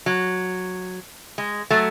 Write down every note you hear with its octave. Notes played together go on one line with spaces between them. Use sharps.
F#3
G#3
F#3 A3